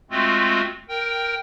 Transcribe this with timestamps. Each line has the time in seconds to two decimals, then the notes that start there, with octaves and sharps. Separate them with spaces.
0.11 G#3 A3 C4 F4 F#4
0.89 A#4 G5